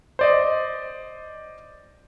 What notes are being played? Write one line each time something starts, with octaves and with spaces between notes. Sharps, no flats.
C5 D5 D#5